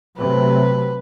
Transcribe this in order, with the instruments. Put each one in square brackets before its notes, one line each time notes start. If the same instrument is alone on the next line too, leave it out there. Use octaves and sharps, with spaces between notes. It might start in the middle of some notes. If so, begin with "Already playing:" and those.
[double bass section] C3 F#3 A3 [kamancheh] B4